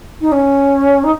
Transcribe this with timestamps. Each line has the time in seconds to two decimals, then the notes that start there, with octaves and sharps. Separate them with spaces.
0.21 D#4
0.32 C#4
1.04 D#4